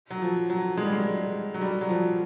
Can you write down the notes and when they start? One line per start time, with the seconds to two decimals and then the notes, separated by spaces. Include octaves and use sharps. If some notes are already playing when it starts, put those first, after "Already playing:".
0.10 F#3
0.22 F3
0.50 F#3
0.77 G#3
0.85 G3
0.93 G#3
1.54 F#3
1.61 G3
1.81 F#3
1.89 F3